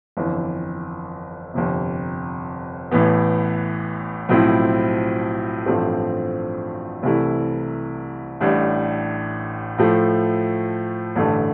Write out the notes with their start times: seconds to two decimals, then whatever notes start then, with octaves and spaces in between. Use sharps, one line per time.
0.17 G1 F2 E3
1.54 G1 F2 C3
2.91 A1 A2 E3 B3
4.29 B1 A2 F3 C4 E4
5.66 A1 G2 F3 A3 C4
7.03 C2 C3 E3 A3 E4
8.40 A1 A2 G3 D4
9.78 A2 F3 A3
11.15 A1 G2 D3 A3